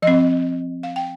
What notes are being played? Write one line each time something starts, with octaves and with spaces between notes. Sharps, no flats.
F3 C4 D#5
F5
G5